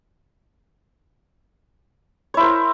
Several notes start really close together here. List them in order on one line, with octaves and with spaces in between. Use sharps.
C#5 E4 C5 A#4